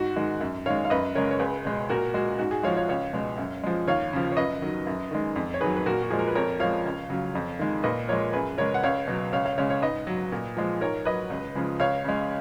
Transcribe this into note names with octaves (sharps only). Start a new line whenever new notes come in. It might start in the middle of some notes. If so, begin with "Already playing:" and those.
Already playing: G#2 F#4
D#3 G#3
F#2
D#3 G#3 C#5 F5
F5
F#2 B4 D#5
C#3 G#3 A#4 C#5
C#5
C#2 G#4 B4
B2 G#3
A#2 F#4 A#4
G#3 F#4
G#2 F#4
G#4
F3 G#3 C#5 F5
C#5 F5
C#2 C#5 F5
B2 G#3
F#2
F3 G#3
D#2 C#5 F5
C#3 F3
C#5
F#2 B4 D#5
D#3 F#3
F#2
D#3 G#3
F2
C#5
D#3 F#3 G#4 B4
B4
A#2 F#4 A#4
F#4
F3 G#3 G#4
A#4
B4
F2 A#4 C#5
F3 G#3 C#5 F5
C#2
C#3 F#3
F2
D#3 G#3
A#2 B4 D#5
F3 G#3 A#4 C#5
F#2 G#4 B4
C#3 G#3 A#4 C#5
F#5
C#2 C#5 F5
B2 F#3
C#2 C#5 F5
C#5 F5
C#3 G#3 C#5 F5
C#5 F5
G#2 B4 D#5
F#3
A#2
F3 G#3
G#2 A#4 C#5
F#3 B4 D#5
C#2
C#3 F3 G#3
C#2 C#5 F5
C#3 G#3